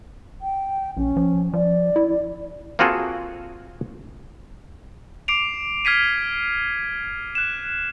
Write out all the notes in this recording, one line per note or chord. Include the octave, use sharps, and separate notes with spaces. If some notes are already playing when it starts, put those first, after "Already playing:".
G5
A#1 C#4
F3
F3 D5
E4
A#3 C4 F4 F#4 G#4 A4
D6 C7 D7 F7
F6 G#6 B6 C7 D#7
F#6 E7